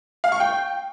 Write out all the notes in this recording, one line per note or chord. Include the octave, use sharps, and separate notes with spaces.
F5
C#6
G5